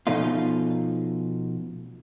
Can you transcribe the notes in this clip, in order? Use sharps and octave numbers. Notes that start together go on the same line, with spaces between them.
B2 F3 A3 C#4 D#4 F4